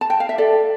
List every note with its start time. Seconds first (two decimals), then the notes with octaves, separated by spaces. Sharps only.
0.01 A5
0.10 G5
0.20 F5
0.29 E5
0.38 A4 D5